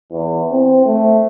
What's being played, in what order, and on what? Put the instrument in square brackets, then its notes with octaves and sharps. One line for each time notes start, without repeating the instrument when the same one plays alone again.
[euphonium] E2
C4
A3